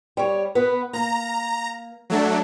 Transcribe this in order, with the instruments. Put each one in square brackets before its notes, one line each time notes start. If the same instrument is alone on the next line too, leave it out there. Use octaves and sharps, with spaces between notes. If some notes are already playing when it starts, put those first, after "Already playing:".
[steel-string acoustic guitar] G3 C#5
B3 B4
[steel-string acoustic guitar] A#3 [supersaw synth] A#5
[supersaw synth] F#3 A3 D4